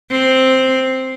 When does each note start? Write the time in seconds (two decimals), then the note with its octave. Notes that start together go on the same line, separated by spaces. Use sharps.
0.11 C4